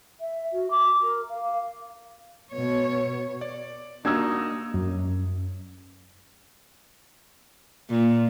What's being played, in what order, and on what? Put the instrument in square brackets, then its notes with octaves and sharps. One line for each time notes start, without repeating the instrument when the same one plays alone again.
[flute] E5
F#4
D6
A#4
F5
[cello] B2 C#5
[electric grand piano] D5
[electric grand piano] A#3 F#4 [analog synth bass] D4 [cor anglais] D#4 [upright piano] E6 G#6
[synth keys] F#2
[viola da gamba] A#2